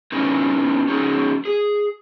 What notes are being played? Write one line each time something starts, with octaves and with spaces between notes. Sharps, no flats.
C#4 D#4 E4 G4 A#4 B4
C#4 D#4 F#4 G#4
G#4